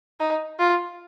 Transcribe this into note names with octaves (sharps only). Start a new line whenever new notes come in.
D#4
F4